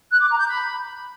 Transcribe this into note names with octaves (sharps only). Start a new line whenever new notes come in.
F#6
D6
A#5
G6
B5